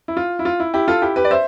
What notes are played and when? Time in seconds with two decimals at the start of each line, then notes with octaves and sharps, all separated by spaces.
0.08 E4
0.17 F4
0.39 E4
0.45 F4
0.60 E4
0.74 E4 G4
0.88 F4 A4
1.02 E4 G4
1.16 G4 B4
1.25 D5
1.31 C5 E5